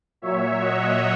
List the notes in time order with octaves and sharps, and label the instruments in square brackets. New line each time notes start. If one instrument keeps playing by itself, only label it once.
[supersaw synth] A#2 F#3 C#5 E5
D#5 F#5